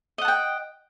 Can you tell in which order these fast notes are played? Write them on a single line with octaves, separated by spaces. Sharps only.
D#5 F#5 A5 G5